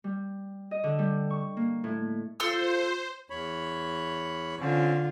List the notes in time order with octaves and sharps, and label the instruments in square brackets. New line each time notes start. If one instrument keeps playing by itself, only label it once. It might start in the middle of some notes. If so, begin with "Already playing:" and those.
[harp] G3
D#5
D3
G3
C#6
A#3
A2
[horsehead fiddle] F4 [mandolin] A4 C6 E6 [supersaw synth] C5
[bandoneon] E2 C#5 B5
[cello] D3 F4 [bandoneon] C4 C#4